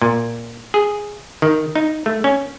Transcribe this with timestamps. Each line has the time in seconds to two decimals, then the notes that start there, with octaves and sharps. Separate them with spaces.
0.02 A#2
0.74 G#4
1.42 D#3
1.75 D#4
2.06 A3
2.24 C#4